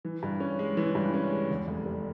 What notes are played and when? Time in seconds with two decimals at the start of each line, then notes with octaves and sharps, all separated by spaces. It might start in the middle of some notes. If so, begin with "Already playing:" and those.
0.05 E3
0.23 G2
0.40 C#4
0.59 G#3
0.77 E3
0.95 G2
1.14 C#4
1.32 G#3
1.50 E2
1.68 F1
1.86 G3